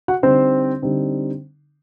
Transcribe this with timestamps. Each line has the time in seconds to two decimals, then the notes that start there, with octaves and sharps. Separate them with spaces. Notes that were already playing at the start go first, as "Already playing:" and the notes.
0.08 F#4 F#5
0.22 D3 G3 C4 D#4 C5
0.82 D3 G3 C4 D#4